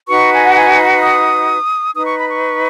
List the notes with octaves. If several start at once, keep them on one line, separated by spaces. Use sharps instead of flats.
D#4 F#4 B4 C#6
G#5
F#5
G#5
D#6
D#4 B4 D#6
C#6
B5
C#6